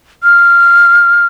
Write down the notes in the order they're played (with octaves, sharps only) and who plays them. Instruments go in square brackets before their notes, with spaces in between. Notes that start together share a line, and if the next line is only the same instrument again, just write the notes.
[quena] F6